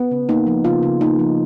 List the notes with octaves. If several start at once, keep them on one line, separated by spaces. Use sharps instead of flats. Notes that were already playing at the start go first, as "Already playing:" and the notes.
Already playing: B3
C#3
A#3 D#4
F3
C#3 F4
C#3
A#3 D#4
F3